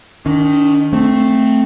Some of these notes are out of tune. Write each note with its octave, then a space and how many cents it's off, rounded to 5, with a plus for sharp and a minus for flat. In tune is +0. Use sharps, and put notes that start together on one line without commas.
D#3 +0 D4 -45
A3 +0 C4 +0